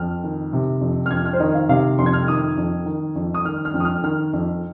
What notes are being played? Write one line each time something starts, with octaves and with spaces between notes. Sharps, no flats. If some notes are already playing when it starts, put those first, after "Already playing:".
Already playing: F2 F6
D#3
C3
F2
F6
F2 G#6
F6
C5
D#3 D#5
F5
C3 F5
F2 C6
G#6
F6
D#3 D#6
F2
D#3
F2
D#6
D#3 F6
F6
F2
D#6
F6
D#3 F6
F2